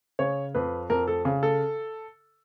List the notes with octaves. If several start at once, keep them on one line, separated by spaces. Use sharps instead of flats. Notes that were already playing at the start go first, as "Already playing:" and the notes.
C#3 C#5
F2 B4
F2 A#4
A4
C#3
A4